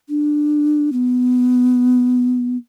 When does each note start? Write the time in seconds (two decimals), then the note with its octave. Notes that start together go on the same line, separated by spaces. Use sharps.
0.09 D4
0.92 B3